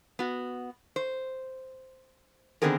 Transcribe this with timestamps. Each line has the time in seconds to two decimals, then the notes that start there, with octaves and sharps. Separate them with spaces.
0.19 B3 F#4
0.96 C5
2.62 D3 D#3 B3 C4 G#4 A#4